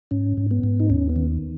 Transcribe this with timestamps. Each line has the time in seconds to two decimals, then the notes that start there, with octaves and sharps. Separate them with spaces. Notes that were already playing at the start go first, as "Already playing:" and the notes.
0.11 G#2 C#4
0.37 G#2
0.51 B3
0.63 G#2
0.80 D#4
0.90 D#2 C#4
1.09 B3
1.16 D#3